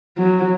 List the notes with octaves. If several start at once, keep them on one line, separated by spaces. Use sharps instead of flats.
F#3